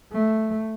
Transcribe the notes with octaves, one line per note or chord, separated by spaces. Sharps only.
A3